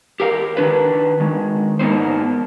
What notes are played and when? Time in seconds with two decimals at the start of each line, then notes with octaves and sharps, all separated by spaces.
0.20 G4 A#4 F5
0.57 D#3 D4 B4
1.20 D#3 G#3
1.79 G#2 A#3 B3 D#4 C5